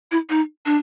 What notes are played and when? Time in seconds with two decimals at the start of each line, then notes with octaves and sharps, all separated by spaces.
0.12 E4
0.30 D#4
0.66 D4